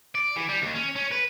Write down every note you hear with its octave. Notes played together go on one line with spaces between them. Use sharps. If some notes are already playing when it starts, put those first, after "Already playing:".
D5
E3
G3
D#2
C#4
C#4
B4